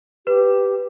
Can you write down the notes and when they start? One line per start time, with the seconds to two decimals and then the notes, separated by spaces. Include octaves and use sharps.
0.27 G4 B4